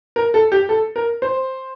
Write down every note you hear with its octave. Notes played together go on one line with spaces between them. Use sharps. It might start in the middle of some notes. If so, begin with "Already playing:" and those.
A#4
A4
G4
A4
A#4
C5